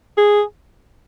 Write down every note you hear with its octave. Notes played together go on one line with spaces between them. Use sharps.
G#4